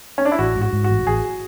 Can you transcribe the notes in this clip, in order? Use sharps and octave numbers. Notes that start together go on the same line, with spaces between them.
C#4
D4
E4
A1 F#4
G#2
F#4
G#2
F#4
A1
A1 G#4